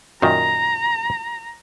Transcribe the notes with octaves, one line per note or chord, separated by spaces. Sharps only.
F#2 A#2 D#3 A#5